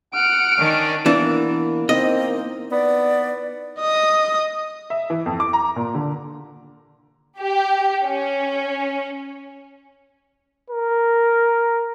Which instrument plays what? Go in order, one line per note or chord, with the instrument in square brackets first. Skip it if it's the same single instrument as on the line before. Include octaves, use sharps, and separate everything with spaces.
[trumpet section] F#5 [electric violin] F6 D7
[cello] D#3 [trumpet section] C#4 D4
[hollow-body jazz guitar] E3 D4 [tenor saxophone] A#3 [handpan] B3 E4 A#4
[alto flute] C4 [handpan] D#4 [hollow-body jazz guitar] D#5
[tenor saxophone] B3 [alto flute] D5
[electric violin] D#5 D#6
[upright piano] E5
E3
F2
D6
A#5
A#2
D3
[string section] G4
C#4
[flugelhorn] A#4